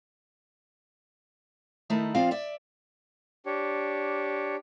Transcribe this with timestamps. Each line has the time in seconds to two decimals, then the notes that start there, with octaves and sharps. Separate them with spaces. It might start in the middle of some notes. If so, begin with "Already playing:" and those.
1.90 D#3 A3 D#4 E4
2.15 F3 C4 F4 D5 F5
2.31 D5 E5
3.46 D4 G4 C#5